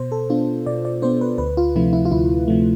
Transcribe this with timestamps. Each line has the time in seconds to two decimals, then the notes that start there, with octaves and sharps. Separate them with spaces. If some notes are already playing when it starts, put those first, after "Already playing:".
Already playing: B2 C5
0.12 A4
0.30 B3 D4 F4
0.66 B2 D5
0.85 D5
1.02 B3 D4 C5
1.21 B4
1.38 D2 B4
1.57 F4
1.76 C3 F3 A3 E4
1.93 E4
2.05 F4
2.11 D2 E4
2.48 C3 F3 A3